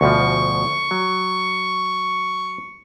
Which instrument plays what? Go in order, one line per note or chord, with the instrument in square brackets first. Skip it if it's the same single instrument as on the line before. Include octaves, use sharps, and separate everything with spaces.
[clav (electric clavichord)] D2 B2 F3 [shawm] C#6
[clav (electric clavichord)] F#3